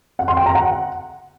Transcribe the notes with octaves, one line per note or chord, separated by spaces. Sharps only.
F#5
C6
G5
A#5
F#5